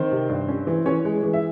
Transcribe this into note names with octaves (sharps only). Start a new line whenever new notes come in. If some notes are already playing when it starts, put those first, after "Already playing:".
Already playing: D#3 C4 C5
C3
G2
C#4
E3
E3 C#4 C#5
G#3
E3
E5